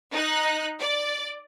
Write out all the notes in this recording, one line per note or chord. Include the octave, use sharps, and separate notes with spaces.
D#4 F#6
D5